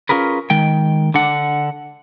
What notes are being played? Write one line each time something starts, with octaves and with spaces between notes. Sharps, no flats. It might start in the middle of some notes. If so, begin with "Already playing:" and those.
C#4 F4 G#4 A#4 B4
D#3 G#3 G5
D3 D4 F#5